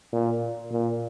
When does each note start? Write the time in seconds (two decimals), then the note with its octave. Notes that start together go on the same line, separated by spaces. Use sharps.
0.13 A#2
0.71 A#2